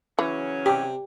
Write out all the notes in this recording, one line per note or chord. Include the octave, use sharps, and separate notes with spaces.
C#3 E3 F#3 C#4
C3 G4